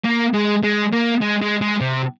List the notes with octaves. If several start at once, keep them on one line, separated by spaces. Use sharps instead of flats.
A#3
G#3
G#3
A#3
G#3
G#3
G#3
C3